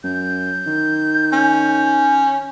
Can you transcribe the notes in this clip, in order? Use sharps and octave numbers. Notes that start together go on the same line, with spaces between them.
F#2 G6
D#3
C#4